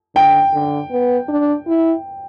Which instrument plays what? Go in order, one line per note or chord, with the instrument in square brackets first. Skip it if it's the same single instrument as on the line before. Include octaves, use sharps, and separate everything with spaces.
[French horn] D3 [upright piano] G5
[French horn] D3
B3
D4
E4